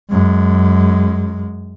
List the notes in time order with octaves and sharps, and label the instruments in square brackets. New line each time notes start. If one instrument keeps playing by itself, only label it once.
[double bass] F#2 G#3